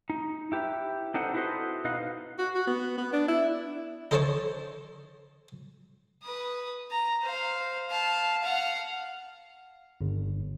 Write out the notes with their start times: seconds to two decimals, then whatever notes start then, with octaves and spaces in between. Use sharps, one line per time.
0.10 D#4
0.52 E4 G4 B4
1.14 C4 D4 D#4 A4 C5 F#5
1.34 E4 F#4 A4 B4 C5 D#5
1.84 B2 D#4 B4 D#5 F5
2.38 F#4
2.55 F#4
2.67 B3
2.97 B3
3.13 D4
3.28 E4
4.11 D#4 A4 C5 C#5 A5 C#6
6.23 B4 D#6
6.91 A#5
7.22 C5 F5
7.89 F5 A5
8.43 F5 F#5
10.01 G1